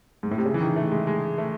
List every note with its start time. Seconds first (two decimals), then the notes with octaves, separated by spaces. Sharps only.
0.23 G#2
0.31 A2
0.38 C3
0.45 C#3
0.54 E3
0.61 D#3
0.76 A3
0.92 G#3
1.07 G#3
1.38 A3